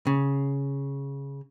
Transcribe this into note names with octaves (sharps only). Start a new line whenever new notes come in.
C#3